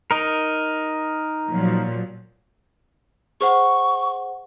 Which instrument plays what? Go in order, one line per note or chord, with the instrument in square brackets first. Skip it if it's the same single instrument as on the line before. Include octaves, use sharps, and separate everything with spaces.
[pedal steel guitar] D#4 A#4
[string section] A#2 F3 F#3
[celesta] G#4 C5 F#5 [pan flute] C#6